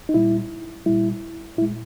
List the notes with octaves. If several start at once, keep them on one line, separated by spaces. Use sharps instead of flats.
D#4
A#2 G3 E4
A#2 G3 E4
A#2 G#3 E4